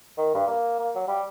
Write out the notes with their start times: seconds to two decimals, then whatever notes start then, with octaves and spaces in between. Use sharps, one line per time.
0.18 D#3
0.34 G2
0.47 A#3
0.79 A#3
0.95 F#3
1.08 G3